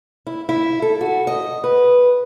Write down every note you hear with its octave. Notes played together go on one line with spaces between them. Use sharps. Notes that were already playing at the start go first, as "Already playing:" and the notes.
E4
E4
A4
F#4
D#5
B4